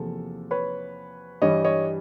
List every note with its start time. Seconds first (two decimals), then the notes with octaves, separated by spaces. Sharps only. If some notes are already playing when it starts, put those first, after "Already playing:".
Already playing: E2 C3 F3 A#3 A4
0.51 B4 C#5
1.42 G2 E3 G3 C#5 D#5
1.64 C#5 D#5